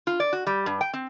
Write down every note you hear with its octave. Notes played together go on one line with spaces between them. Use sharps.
F4
D5
F#4
G3
G2
G5
C4